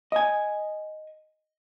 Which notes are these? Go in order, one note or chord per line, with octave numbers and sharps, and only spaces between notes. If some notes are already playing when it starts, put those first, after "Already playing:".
D#5 G#5